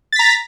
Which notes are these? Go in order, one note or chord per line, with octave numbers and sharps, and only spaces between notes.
A#5 A6 B6